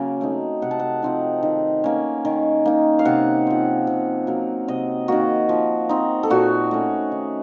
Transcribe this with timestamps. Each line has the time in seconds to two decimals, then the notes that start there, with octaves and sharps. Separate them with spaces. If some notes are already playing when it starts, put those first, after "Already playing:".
Already playing: C#3 F#3 A#3 C#4
0.21 A3 C4 D#4
0.62 C3 F#5
0.71 A5
0.80 F#5
1.02 F3 C4 D#4
1.43 D#3
1.84 A#3 C#4
2.25 D#3
2.66 A#3 D#4
2.99 F5
3.05 C3 F#5
3.47 F3 C4
3.87 C3
4.27 F#3 A#3
4.68 C3 D#5
5.08 D#3 A#3 F#4
5.49 F3
5.89 C4 D#4
6.23 A4
6.30 A#2 F#4
6.71 A3 C#4
7.12 D#3